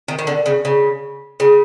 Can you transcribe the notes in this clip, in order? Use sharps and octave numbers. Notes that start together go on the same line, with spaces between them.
D#3
D#3
D3
C#3
C#3
C#3